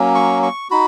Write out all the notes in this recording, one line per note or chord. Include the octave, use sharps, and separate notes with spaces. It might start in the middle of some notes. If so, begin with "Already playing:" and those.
Already playing: F#3 A#3 C#4
C#6
C#6
D#4 F#4 B5